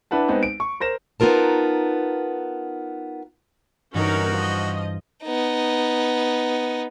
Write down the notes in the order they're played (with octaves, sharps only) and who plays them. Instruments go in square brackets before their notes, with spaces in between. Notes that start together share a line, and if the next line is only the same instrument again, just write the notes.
[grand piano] D4 E4 B4 F#5 A5
G#3 B3 C4 D#4
D7
C#6
A#4 C5 A#6 E7
[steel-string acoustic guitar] B3 D#4 F4 A#4 A5
[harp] G2 E3 [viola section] C#4 D#4 A#4 [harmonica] F#4
[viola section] F3 D#5
[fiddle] B3 D#4